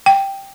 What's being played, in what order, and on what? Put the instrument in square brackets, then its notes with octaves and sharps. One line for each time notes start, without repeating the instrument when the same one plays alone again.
[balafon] G5